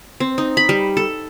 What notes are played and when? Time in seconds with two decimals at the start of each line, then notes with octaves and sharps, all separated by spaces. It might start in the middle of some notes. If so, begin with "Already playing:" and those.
0.20 C4
0.38 D#4
0.57 B5
0.69 G3
0.97 A4